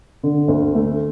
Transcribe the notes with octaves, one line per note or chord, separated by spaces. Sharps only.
D3
D2
A3